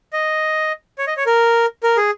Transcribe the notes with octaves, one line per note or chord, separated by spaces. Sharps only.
D#5
C#5
D#5
C#5
A#4
A#4
G#4